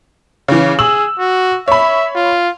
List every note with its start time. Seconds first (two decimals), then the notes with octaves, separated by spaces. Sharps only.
0.48 C#3 E3
0.79 G#4 E6 F#7
1.19 F#4
1.68 C#5 E5 B5
2.15 F4